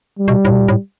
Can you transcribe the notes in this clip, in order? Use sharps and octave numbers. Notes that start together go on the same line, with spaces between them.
G3
B2
A2
B2
A#2
A2